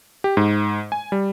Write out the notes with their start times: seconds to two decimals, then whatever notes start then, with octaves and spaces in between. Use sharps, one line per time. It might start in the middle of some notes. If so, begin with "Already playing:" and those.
0.24 G4
0.37 G#2
0.92 G#5
1.12 G3